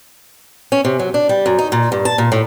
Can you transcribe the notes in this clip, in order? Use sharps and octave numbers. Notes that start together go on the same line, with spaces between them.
C#4
C3
F#3
D4
G3
F#2
D#4
A#2
G2
A5
A#2
A2